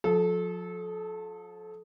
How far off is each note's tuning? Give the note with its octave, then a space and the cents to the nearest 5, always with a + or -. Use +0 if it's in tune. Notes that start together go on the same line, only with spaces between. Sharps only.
F3 +35 A4 -25